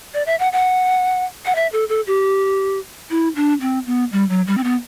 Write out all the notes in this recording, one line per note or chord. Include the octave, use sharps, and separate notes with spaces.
D5
E5
F#5
F#5
F#5
E5
A4
A4
G4
E4
D4
C4
B3
G3
F#3
G3
C4
B3